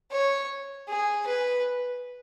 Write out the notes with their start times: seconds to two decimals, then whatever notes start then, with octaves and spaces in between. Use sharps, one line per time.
0.12 C#5
0.88 G#4
1.27 B4